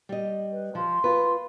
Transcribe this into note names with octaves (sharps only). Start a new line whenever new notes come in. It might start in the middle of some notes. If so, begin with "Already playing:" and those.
G3 D#5
B4
F3 C6
F4 B4